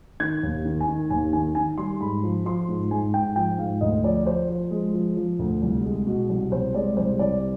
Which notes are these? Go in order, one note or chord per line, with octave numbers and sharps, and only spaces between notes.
D#3 G#6
D#2
D#3
G#5
D#3
D#2 G#5
D#3 G#5
D#3 G#5
G3 C6
G#2 B5
F3
F3 C6
G#2
G#2 G#5
G#2 G5
F3 G5
G#2 F5
D2 D#5
F3 D5
F3 C5
F3
G#3
F3
F3
D2
C2
G#3
B2
C2
C2 C5
G#3 D5
C2 C5
C2 D5